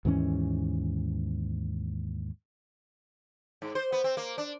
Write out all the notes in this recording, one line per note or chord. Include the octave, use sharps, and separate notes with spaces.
D#2 G#2 E3 C#4
G#2
C5
B3
C4
A#3
D4